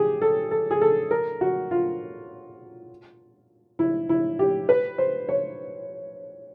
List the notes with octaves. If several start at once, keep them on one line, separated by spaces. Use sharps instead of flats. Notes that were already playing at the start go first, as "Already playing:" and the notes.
Already playing: G4 G#4
A4
A4
G#4
A4
A#4
F#4
F4
E4
E4
G4
B4
C5
C#5